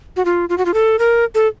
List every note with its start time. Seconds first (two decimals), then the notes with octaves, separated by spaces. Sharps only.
0.16 F#4
0.25 F4
0.49 F4
0.58 F#4
0.66 F4
0.74 A4
0.99 A#4
1.35 A4